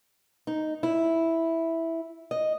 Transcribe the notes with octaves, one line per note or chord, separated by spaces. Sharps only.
D#4
E4
D#5